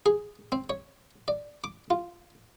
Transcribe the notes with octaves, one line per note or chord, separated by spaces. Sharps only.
G#4
C4
C#5
D5
D6
F4